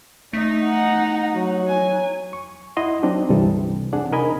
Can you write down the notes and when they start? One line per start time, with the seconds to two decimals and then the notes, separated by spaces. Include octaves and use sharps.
0.33 A3 D#4
0.63 F#5 A#5
1.34 F#3 F#4
1.68 G#5
2.33 C#6
2.77 E4 D#5 F#5 C6
3.03 F#3 C4 D4 D#4
3.29 C#2 G2 C3 E3 G3 A4
3.93 C4 D4 G#4 F#5
4.12 C3 D#4 A#4 D#5 G#5 B5